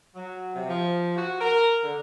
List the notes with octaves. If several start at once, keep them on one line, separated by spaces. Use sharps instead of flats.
F#3
C3
F3
F#4
A#4
D3